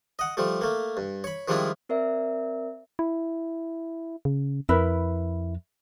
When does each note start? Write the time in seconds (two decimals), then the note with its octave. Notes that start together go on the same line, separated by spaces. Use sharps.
0.19 D#5 F#5
0.37 F3 G3 A3
0.61 A3 A#3
0.97 G2
1.24 C#5 B5
1.48 D#3 F3 G3 G#3 D4 E4
1.89 C4 A#4 D5 E5
2.99 E4
4.25 C#3
4.69 F2 E4 A#4 B4